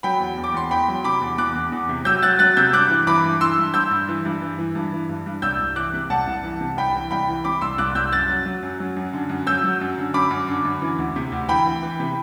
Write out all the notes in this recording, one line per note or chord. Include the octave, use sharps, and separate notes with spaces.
F#3 G5 B5
E2
E2
D6
E2 C6
E2 G5 B5
F#3
C3 B5 D6
E2
E2 D6 F#6
E2
E2
C3
F#3 E6 G6
F#3 F#6 A6
F#3 F#6 A6
C3 E6 G6
G2 D6 F#6
E3
E3 B5 D6
G2
E3 C6 E6
G2
G2 E6 G6
G2
E3
G2
E3
E3
G2
E3
G2
G2
C2 E6 G6
C2
E3 D6 F#6
C3
C2 F#5 A5
C2
E3
C3
C2 G5 B5
E3
C2 G5 B5
E3
C3 B5 D6
C2 C6 E6
C2 D6 F#6
C2 E6 G6
F#2 F#6 A6
F#3
F#3
F#2
F#3
F#2
D3
F#2
F#3 E6 G6
F#3
F#2
D3
F#2 B5 D6
F#2
D3
F#2
E3
D2
C3
D2
E3 G5 B5
E3
E3
C3